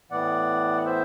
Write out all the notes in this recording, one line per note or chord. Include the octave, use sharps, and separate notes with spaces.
A2 E3 B3 D5 F#5
C5 E5